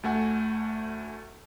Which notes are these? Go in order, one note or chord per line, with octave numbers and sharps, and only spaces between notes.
D2 A3 F#5 G#5